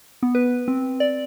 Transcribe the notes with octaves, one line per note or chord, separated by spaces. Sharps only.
B3
B4
C4
D5